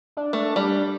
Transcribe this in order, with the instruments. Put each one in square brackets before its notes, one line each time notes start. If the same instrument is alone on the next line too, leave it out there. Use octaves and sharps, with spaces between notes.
[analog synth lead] D4
[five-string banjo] A3
G3